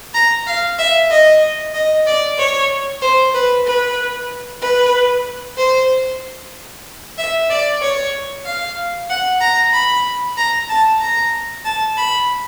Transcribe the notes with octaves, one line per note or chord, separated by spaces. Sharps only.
A#5
F5
E5
D#5
D#5
D5
C#5
C5
B4
B4
B4
C5
E5
D5
C#5
F5
F#5
A#5
B5
A#5
A5
A#5
A5
B5